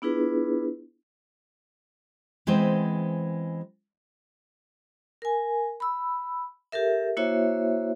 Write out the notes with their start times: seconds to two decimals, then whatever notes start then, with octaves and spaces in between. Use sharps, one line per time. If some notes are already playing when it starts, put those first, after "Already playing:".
0.02 B3 D4 E4 F4 G#4 B4
2.47 E3 G#3 B3 C4 C5
5.22 A#4 G#5
5.80 B5 E6
6.72 G4 A4 A#4 E5
7.17 A#3 E4 F#4 C5 C#5 E5